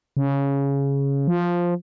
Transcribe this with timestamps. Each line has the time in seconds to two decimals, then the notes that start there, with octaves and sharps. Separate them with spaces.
0.17 C#3
1.28 F3